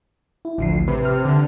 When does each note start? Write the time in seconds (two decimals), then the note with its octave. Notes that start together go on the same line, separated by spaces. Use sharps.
0.45 E4
0.58 A1 D2 F3 C7
0.88 C3 B4
1.05 F6
1.25 D3